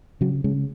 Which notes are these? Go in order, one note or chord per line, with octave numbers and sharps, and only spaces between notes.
C#3 F#3
C#3 G#3